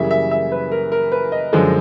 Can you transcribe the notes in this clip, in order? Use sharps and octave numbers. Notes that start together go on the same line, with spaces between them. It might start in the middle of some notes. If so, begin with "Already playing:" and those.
Already playing: F#2 C#3 E3 G3 A#3 E5
E5
E5
B4
A#4
A#4
B4
D#5
F#2 D3 F3 G#3